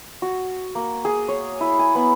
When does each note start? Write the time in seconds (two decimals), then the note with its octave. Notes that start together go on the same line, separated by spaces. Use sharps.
0.22 F#4
0.75 A#3
1.05 G#4
1.28 C#5
1.61 E4
1.79 G#5
1.95 B3